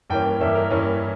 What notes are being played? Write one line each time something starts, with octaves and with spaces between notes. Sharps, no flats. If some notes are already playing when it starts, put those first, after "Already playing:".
G2 E3 A#3 C#4 G5
G2 E3 A#3 C#4 E5
A#4
G2 E3 A#3 C#4